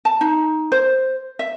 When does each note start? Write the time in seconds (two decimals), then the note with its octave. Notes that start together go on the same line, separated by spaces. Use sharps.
0.05 A5
0.21 D#4
0.72 C5
1.39 E5